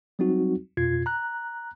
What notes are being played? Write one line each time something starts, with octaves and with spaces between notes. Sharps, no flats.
F#3 G3 C4 D#4 F#4
F2 B2 F4 G#6 C7
A#5 F#6